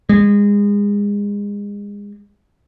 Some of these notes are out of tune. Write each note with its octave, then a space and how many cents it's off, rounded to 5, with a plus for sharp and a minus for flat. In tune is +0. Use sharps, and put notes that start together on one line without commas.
G#3 -30